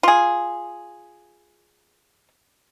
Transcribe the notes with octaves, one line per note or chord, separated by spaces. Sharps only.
F4 G#4